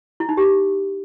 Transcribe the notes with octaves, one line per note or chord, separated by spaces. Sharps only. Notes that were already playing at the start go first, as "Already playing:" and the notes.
E4
D#4
G4